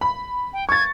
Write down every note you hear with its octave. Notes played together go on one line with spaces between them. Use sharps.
B5
G5
C#6 G#6 A6